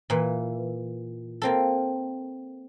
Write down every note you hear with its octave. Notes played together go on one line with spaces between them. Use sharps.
A#2 E3
A#3 C4 A4